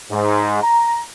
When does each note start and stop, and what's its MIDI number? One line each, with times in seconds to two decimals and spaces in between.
0.11 0.63 44
0.63 0.99 82